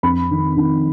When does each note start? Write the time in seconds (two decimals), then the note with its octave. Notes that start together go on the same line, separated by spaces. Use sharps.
0.03 F2 B5
0.31 D#3
0.57 D#3